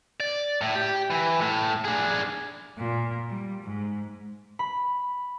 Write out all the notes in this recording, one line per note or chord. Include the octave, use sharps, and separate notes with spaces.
D5
A2
G4
E3
A2
D4 G#4
A#2
G3
G#2
B5